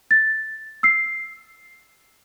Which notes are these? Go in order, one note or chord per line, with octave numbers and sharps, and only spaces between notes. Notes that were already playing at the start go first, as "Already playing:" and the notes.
A6
E6 C7